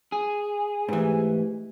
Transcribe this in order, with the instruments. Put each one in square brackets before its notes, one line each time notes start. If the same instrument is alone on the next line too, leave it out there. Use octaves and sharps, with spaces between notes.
[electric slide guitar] G#4
[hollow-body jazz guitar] G#2 E3 [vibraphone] A3 G4 B4